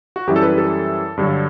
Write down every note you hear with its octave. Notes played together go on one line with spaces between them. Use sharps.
F#4
F#2 E3 G3 G4
A4
B4
A4
G2 D3 F#3